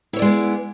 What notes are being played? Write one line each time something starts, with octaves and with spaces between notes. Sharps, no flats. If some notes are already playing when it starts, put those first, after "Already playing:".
G#3 B3 E4 C#5 D5